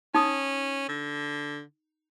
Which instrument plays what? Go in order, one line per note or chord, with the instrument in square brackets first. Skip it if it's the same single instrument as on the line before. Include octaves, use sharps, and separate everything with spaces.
[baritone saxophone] C#4 [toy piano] D#4 D#6
[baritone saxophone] D3